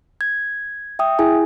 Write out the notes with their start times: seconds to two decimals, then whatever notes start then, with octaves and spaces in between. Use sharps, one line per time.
0.21 G#6
0.99 E5 G5 D#6
1.19 E4 G#4 G#5